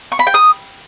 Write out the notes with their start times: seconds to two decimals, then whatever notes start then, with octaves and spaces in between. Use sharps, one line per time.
0.12 C#6
0.19 B5
0.27 G5
0.34 D#6